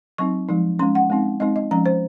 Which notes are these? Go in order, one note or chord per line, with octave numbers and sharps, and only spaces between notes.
F#3 C4 D#4 C#6
F3 G#3 D#4
G#3 C#4 C6
F#5
G#3 C4 D#4
G#3 C4 D#4 D#5
D#5
F3 G#3 C#4 A#5
C5